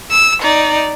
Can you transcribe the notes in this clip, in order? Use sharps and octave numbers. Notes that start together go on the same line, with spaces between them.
E6
D#4 D5